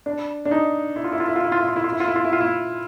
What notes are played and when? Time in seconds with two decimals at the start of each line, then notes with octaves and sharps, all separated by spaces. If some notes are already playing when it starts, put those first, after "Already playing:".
0.06 D4
0.45 D4
0.51 D#4
0.96 E4
1.04 F4
1.12 E4
1.20 F4
1.28 E4
1.36 F4
1.44 E4
1.52 F4
1.59 E4
1.68 F4
1.76 E4
1.84 F4
1.92 E4
2.00 F4
2.08 E4
2.16 F4
2.25 E4
2.33 F4
2.41 E4